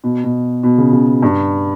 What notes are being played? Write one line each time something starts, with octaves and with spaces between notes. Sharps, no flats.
B2
B2
B2
C#3
C#3
B2
G2